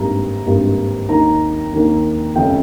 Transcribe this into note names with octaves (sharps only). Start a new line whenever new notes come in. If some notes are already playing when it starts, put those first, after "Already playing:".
Already playing: G#1 G2 G3 A#3 A#5
G#1 G2 G3 A#3
D#2 D#3 A#3 A#5
D#2 D#3 A#3
F1 C#3 G5